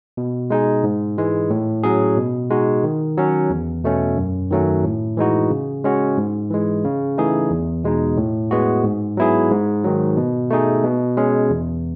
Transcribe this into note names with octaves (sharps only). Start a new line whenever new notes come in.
B2
G#3 D#4 G#4
G#2
E3 G#3
A2
F#3 C#4 G#4
B2
G#3 D#4 F#4
D#3
F#3 C#4
E2
B2 A3 C#4
F#2
D#3 F#3 A3 C#4
A2
E3 G#3 D#4 F#4
C#3
G#3 C#4 F#4
G#2
E3 G#3
C#3
E3 A3 D#4 G#4
E2
B2 G#3 D#4
A2
G#3 B3 F#4
G#2
F#3 B3 E4 G#4
G#2
D#3 F#3
B2
A3 D#4 G#4
B2
G#3 C#4 G#4
E2